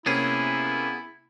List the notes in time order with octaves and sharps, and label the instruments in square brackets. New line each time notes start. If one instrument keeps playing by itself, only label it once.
[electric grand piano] C3 A#3 C#4 [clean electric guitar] B3 G#4 [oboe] E4